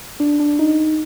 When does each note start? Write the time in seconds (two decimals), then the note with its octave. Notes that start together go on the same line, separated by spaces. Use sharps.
0.20 D4
0.39 D4
0.59 D#4